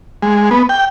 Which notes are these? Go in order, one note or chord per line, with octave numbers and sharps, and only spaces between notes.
G#3
B3
G5